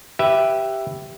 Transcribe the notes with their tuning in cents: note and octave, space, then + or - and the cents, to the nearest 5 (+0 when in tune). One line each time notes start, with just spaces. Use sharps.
G4 +0 B4 +0 E5 +5